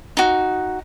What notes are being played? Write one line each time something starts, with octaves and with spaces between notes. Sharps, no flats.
D#4 F#4